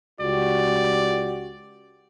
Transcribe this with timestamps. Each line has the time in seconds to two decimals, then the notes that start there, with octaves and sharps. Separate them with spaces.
0.21 C#2 F#4 G4 D5